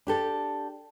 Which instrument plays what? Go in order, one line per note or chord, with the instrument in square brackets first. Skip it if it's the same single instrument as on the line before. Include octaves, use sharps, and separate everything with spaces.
[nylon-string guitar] D4 G4 A4